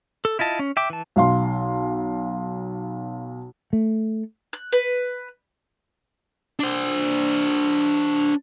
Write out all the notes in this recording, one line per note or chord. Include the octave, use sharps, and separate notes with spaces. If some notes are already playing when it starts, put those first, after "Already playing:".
A4
E4 F4 D#5 A5
C#4
E5 G5 D6
E3 A5
B1 F5 C6
A3
F#6
B4
D4 C5